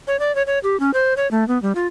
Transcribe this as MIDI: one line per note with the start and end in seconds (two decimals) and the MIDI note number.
0.07 0.19 73
0.19 0.34 74
0.35 0.42 73
0.47 0.59 73
0.63 0.79 67
0.80 0.91 61
0.94 1.14 72
1.17 1.29 73
1.31 1.46 57
1.48 1.60 59
1.62 1.73 55
1.75 1.87 65